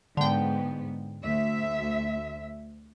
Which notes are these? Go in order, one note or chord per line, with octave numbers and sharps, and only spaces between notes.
G#2 D3 B3 G5
D2 E5